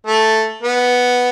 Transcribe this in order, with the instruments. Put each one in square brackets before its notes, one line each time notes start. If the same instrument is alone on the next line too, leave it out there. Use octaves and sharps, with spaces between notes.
[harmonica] A3
B3